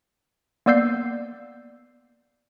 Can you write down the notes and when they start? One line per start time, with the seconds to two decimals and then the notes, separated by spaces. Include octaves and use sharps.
0.66 A#3 B3 D5 E6 G6 C7